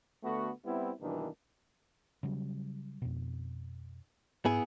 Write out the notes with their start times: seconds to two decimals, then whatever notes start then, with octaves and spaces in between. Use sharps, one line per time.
0.23 D3 A3 B3 F#4
0.65 G3 B3 C4 E4
1.01 G2 B2 D#3 E3 A#3 D4
2.23 C#3 F#3 G3
3.02 F2 B2
4.45 G#2 B3 E4 G#4